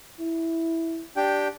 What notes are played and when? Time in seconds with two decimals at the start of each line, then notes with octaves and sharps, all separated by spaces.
0.20 E4
1.17 D4 G4 G5